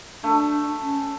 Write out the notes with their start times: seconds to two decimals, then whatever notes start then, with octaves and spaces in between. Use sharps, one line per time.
0.23 A3 D4
0.82 C#4